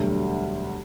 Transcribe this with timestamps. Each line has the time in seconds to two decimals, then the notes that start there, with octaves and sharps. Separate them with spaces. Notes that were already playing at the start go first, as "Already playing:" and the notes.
Already playing: E1 D2 D3 F#3 G3 A3